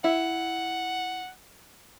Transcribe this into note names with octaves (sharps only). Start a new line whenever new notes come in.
E4 F#5